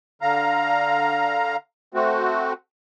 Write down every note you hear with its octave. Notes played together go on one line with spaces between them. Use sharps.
D3 F5 A#5
A3 C4 F#4